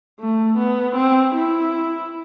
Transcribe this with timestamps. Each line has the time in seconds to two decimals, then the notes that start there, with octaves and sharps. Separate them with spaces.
0.20 A3
0.58 B3
0.96 C4
1.35 E4